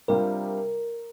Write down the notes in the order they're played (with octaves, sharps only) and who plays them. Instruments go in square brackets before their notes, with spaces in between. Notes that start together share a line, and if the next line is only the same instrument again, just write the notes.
[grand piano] C3 G3 D4 F4 [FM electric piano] A#4